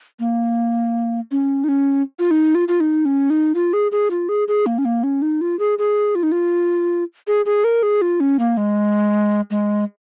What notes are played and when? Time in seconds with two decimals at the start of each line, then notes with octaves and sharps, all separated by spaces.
0.20 A#3
1.31 C#4
1.64 D#4
1.69 C#4
2.19 F4
2.31 D#4
2.55 F4
2.68 F4
2.80 D#4
3.05 C#4
3.30 D#4
3.55 F4
3.73 G#4
3.92 G#4
4.11 F4
4.29 G#4
4.48 G#4
4.66 A#3
4.78 C#4
4.85 A#3
5.03 C#4
5.22 D#4
5.41 F4
5.59 G#4
5.79 G#4
6.15 F4
6.23 D#4
6.32 F4
7.27 G#4
7.46 G#4
7.64 A#4
7.83 G#4
8.02 F4
8.20 C#4
8.39 A#3
8.57 G#3
9.51 G#3